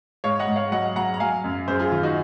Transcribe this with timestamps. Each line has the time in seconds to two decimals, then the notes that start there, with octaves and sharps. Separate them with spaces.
0.24 G#2 C#5 F5
0.39 D#5 F#5
0.47 G#2
0.56 C#5 F5
0.72 F#3 D#5 F#5
0.96 F#3 F#5 A#5
1.14 A#5
1.20 F#3 F5 G#5
1.44 F#2
1.68 F#2 G#4 C5
1.80 F4 G#4
1.92 D#3 F4
2.03 D#4 F#4